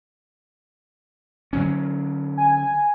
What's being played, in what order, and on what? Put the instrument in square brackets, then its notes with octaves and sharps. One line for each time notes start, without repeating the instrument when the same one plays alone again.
[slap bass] D3 F#3 C#4
[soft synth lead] G#5